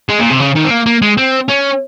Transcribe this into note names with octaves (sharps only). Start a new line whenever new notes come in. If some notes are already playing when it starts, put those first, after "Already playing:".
G#3
A#2
C3
C#3
D#3
C4
A#3
A#3
G#3
C4
C#4